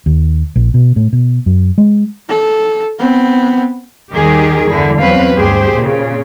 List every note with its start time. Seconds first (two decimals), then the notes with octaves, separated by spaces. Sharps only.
0.06 D#2
0.56 A#1
0.74 B2
0.96 A2
1.13 B2
1.46 F#2
1.78 G#3
2.29 A4
2.99 B3 C4
4.13 D#2 D#3 G3 G4 G#4 A#4
4.69 E2 G2 D3 E4
4.99 E2 F#3 C4 C#4 B4 F5
5.35 D2 G2 G4 G#4 C5
5.74 A#2 C#3